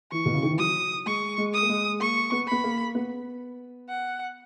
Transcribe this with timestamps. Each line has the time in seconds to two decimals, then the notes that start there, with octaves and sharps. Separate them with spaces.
0.12 E3 C#6
0.26 B2
0.34 C#3
0.43 D#3
0.50 E3
0.59 F#3 D#6
1.06 G#3 C#6
1.38 G#3
1.53 D#6
1.62 A#3
1.69 G#3
2.00 A#3 C#6
2.32 B3
2.48 B3 B5
2.64 A#3
2.95 B3
3.89 F#5